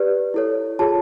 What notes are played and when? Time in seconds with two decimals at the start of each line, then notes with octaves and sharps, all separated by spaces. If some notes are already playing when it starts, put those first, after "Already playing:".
Already playing: G4 B4 D5
0.34 E4 A4 C#5
0.79 F4 G#4 C#5 A5